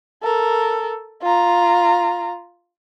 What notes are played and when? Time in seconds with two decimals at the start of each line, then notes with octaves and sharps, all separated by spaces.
0.23 A4 A#4
1.23 F4 A#5